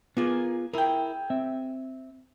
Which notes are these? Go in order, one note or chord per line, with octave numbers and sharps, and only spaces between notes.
A#3 B3 F4 G#4 G#5
E4 G#4 A#4 G5
C4 E5